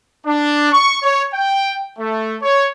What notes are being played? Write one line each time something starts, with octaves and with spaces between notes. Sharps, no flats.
D4
C#6
C#5
G5
A3
C#5